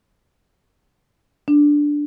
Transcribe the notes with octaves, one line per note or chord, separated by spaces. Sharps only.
D4